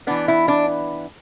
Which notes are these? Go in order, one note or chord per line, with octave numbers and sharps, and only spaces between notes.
E3 B3 D4
E4
D4